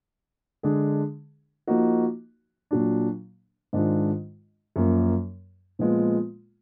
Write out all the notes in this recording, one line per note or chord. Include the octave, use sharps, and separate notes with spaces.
D3 G#3 D4 G#4
F3 A#3 D#4 F#4
A#2 F#3 D4
G#2 D#3 G#3 D4 F4
F#2 F3 A#3
A#2 F3 G#3 B3 F4